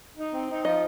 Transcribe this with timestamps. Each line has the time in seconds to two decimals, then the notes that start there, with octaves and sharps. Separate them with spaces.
0.16 D#4
0.32 C4
0.48 D#4
0.65 F3 D#5